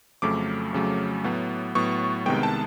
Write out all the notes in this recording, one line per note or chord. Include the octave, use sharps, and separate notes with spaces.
F2 C#3 F#3 A3 D6
F2 C#3 F#3 A3
A2 F#3 B3
A2 F#3 B3 C#6
C2 C3 D#3 G#3 B3 G5
A5